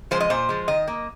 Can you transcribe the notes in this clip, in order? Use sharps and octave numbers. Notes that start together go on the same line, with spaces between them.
F3 G#3 C5
D#5
A#2 C5
F3 G#3
D#3 D#5
A#3